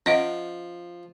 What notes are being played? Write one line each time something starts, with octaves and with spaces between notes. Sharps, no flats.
F3 C#4 D#5 F#5